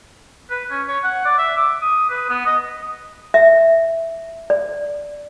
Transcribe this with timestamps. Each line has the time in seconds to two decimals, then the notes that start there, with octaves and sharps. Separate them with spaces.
0.51 B4
0.71 C#4
0.88 C#5
1.04 F#5
1.26 D5
1.38 E5
1.57 D6
1.82 D#6
2.10 B4
2.30 B3
2.46 D#5
3.34 E5
4.50 D5